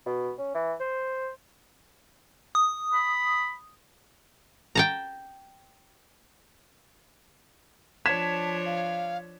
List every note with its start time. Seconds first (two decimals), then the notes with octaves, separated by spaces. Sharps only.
0.06 B2
0.39 C#4
0.55 E3
0.80 C5
2.55 D#6
2.93 B5
4.75 G5 A5 A#5
8.06 F3 D4 C#5 A5 G#6 B6 E7
8.66 F5